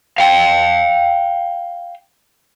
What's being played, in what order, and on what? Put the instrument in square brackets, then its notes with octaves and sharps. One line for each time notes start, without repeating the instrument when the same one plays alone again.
[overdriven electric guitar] F5 G5